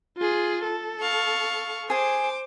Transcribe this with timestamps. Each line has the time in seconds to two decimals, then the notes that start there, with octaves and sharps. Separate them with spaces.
0.17 F4 G#4
0.64 A4
1.01 F5 C#6
1.90 G#4 C5 G#5 D6